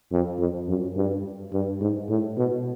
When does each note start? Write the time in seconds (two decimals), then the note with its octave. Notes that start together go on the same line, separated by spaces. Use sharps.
0.12 F2
0.39 F2
0.68 F#2
0.96 G2
1.53 G2
1.81 G#2
2.09 A2
2.38 B2